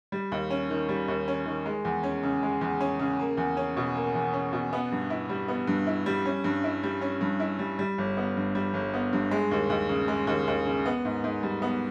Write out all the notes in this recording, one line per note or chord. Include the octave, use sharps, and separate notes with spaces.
G3
D#2
C#4
D#3
G3
D#2
C#4
D#3
G#3
E2
C#4
C#3
G#3
E2
C#4
C#3
A#3
E2
C#4
B2
A#3
E2
C#4
B2
B3
G2
E4
G3
B3
G2
E4
G3
C#4
G2
E4
G3
C#4
G2
E4
G3
G3
G1
B3
G2
G3
G1
B3
G2
G#3
D#2
D#2
C#3
G#3
D#2
D#2
C#3
B3
G#2
G#2
G3
B3